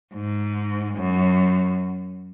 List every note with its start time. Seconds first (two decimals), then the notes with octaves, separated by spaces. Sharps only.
0.14 G#2
0.95 F#2